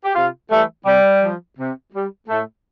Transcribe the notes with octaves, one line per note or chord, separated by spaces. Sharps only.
G4
C3 F4
E3 G3 A3
C3 G3
F3
C3
G3
A2 A3